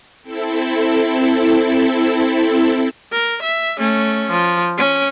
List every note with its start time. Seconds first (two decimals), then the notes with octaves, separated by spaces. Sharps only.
0.23 C4 E4 A4
3.12 A#4
3.42 E5
3.78 A3 C#4
4.30 F3
4.78 C#4